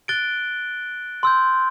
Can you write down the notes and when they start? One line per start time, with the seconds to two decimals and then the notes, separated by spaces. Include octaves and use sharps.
0.08 F#6 A6 D7 G7
1.23 C6 E6 G6